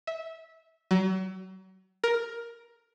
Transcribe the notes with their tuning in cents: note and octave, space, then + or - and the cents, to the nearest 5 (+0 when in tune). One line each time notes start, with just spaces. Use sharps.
E5 -20
F#3 +35
A#4 +10